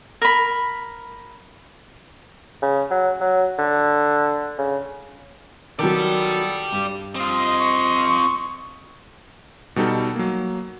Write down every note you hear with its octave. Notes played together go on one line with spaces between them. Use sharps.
A#4 B5
C#3
F#3
F#3
D3
C#3
D#3 F#3 B3 F4 A4 D5 G5
G2
C4 F4 D#5 C6
C#6
B2 G3 D#4 A4
F#3 A#3